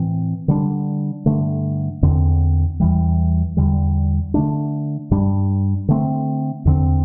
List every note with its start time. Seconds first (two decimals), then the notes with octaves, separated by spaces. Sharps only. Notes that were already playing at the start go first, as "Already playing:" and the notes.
Already playing: A2 E3 C4
0.48 D3 G3 D4
1.26 G2 D3 A3
2.02 E2 D3 C4
2.80 E2 E3 G3
3.57 E2 D3 G3
4.34 D3 A3 D4
5.11 G2 G3 D4
5.88 D3 A3 C4
6.65 E2 D3 A3 C4